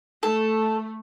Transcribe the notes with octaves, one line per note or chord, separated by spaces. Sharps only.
A3 A4